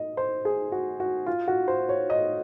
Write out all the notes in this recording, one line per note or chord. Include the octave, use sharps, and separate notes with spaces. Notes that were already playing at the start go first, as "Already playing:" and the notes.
Already playing: D#5
C5
G#4
F#4
F#4
F4
F#4
C5
C#5
D#5